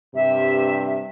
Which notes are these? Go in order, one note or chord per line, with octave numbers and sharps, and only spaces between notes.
G2 C3 E5